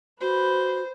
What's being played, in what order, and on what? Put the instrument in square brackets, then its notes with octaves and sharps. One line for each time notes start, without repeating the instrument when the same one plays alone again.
[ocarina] F#4 [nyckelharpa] B4 [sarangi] C5